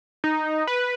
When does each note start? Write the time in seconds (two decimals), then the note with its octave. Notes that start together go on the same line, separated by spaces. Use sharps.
0.24 D#4
0.67 B4